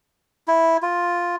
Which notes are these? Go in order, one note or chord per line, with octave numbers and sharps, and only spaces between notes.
E4
F4